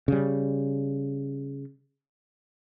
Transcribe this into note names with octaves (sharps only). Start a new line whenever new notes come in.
C#3 G3